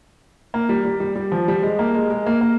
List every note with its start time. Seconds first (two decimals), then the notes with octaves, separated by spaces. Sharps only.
0.54 A#3
0.69 G3
0.85 G3
1.00 G3
1.16 G3
1.32 F3
1.48 G3
1.63 G#3
1.79 A#3
1.95 G#3
2.10 G#3
2.26 A#3
2.41 A#3